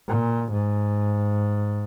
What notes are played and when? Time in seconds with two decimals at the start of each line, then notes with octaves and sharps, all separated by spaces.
0.08 A#2
0.52 G#2